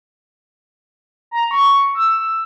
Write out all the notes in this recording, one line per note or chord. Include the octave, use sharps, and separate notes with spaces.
A#5
C#6
E6